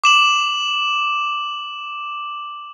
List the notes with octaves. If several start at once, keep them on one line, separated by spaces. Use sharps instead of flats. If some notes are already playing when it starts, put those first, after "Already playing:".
D6 E7 F#7